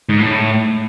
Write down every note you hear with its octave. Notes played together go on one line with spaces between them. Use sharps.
G#2
A2